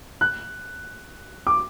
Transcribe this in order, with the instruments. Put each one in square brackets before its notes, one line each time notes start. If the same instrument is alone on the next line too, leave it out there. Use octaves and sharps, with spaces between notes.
[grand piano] F#6
D6